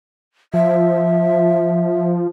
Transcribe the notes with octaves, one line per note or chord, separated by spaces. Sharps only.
F3 E5